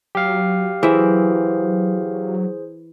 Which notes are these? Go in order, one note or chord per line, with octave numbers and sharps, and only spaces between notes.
F#3 G4 F5
E3 G#4 C5 E5